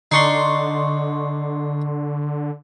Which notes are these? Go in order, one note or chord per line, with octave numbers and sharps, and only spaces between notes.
D3 D4 D#4 C6 C#6 C7